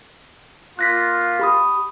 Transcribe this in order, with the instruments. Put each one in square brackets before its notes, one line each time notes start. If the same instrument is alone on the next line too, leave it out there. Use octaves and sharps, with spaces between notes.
[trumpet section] A#3 F4 [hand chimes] F#6 A#6 B6
[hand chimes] G4 B5 D#6